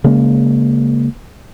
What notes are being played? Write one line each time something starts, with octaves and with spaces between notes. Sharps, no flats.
C#3 G#3 A#3